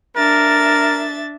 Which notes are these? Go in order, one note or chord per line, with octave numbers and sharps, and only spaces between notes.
D4 A#4 E5 A6